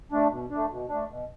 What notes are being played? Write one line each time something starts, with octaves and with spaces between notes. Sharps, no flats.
A3 D4
B2
A3 D4
B2
A3 D4
B2